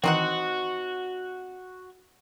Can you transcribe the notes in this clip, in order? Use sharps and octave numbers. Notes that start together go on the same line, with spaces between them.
D#3 E3 C4 D#4 F#4 F#5